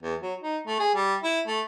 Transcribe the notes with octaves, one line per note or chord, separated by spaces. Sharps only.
E2
F#3
D#4
A3
G#4
G3
E4
A3